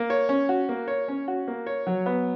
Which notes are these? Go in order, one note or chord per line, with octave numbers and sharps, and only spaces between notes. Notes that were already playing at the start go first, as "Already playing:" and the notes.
Already playing: A#3
C#5
C#4
F#4
A#3
C#5
C#4
F#4
A#3
C#5
F#3
B3